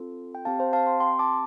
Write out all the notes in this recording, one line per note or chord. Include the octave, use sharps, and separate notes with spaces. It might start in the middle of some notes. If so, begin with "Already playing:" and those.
Already playing: C4 F4 A4
G5
C4 G4 F5 A5
C5 F5
F5 A5
G5 C6
G5 C6
A5 D6